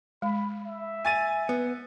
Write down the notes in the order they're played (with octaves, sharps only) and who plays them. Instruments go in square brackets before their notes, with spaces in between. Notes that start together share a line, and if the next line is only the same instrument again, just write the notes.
[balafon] G#3 [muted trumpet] B5
[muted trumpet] E5
[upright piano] G#5 A6 D#7
[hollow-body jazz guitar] B3